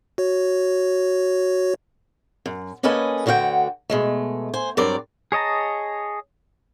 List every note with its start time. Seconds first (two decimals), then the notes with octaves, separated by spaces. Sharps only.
0.18 F#4 C#5
2.46 F#2
2.83 A#3 C#4 A4 B4 D#5 G#5
3.26 D2 D3 F#4 F5 G5
3.90 B2 G#3 A3
4.54 C5 G#5
4.77 G2 F#3 C4 A#4 D5
5.32 G#4 C#5 D#5 A5 A#5